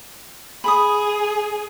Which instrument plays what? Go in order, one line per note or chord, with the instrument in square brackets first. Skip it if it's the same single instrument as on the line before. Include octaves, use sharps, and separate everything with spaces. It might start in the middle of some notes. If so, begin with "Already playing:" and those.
[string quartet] G#4 [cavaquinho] B5 D#6